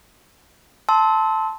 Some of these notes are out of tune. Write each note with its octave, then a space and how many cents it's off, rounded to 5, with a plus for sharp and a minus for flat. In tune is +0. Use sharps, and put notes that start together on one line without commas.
A5 +0 C6 +0 E6 -30